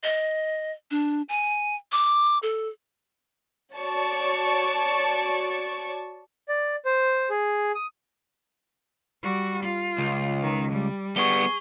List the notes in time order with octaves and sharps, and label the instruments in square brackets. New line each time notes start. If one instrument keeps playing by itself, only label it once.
[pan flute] D#5
D4
G#5
D6
A4
[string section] F#4 C#5 D5 A5 C#6
[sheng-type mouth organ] D5
C5
G#4
D#6
[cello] G3 F#4
F4
[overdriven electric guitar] C#2
[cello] D#3
G3
[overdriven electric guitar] G3 B3 [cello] G#4 [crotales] C#6 G7